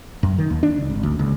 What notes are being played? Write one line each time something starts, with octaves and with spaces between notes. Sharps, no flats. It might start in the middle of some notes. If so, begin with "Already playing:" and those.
F#2
D#3
D#2
D4
C#2
G#1
D2
C#2